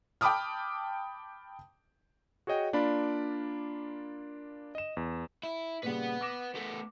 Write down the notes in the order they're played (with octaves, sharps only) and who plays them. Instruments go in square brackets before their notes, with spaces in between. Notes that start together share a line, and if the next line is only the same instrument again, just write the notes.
[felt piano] G5 A5 B5 D6 D#6 F6
[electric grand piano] F#4 G#4 C#5 D#5 G5
A#3 D4 F4 D5 B5
D#5 E7
E2
[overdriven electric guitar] E4
[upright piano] A#2 C#3 G3 [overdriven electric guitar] B4 F#5
[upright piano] D6 A#6 E7
[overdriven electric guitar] A3 B3